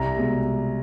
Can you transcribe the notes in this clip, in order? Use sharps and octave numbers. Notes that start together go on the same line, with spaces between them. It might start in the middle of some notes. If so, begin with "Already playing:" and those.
Already playing: C2 A#5
B2 G#3